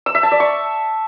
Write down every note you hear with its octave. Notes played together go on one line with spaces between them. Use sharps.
E6
E5
A5
D5
C#6